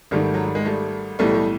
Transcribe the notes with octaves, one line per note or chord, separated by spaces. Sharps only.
G#1 G#2 D#3 G3 A3
F#3
G3
G#3
G3 A3
B1 A2 E3 G3 A3
G3